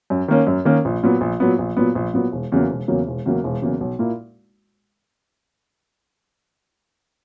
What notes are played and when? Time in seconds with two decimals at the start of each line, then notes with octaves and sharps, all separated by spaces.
0.10 F#2
0.28 D#3 A#3 C#4
0.47 F#2
0.65 D#3 A#3 C#4
0.85 A#1
1.03 A#2 F#3 B3
1.21 A#1
1.40 A#2 F#3 B3
1.59 A#1
1.77 A#2 F#3 B3
1.95 A#1
2.14 A#2 F#3 B3
2.32 E1
2.52 E2 C#3 F#3 A#3
2.70 E1
2.88 E2 C#3 F#3 A#3
3.07 E1
3.26 E2 C#3 F#3 A#3
3.44 E1
3.62 E2 C#3 F#3 A#3
3.80 B1
3.99 A#2 A#3 E4